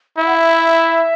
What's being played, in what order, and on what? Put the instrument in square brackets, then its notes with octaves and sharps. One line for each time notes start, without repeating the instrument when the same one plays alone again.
[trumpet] E4 [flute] E5
[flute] F#5
E5